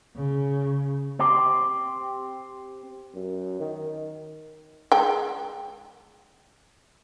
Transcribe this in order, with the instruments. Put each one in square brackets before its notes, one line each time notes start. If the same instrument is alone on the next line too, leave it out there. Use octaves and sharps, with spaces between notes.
[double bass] C#3
[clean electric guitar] C4 G4
[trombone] F#2
D#3
[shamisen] G#3 G5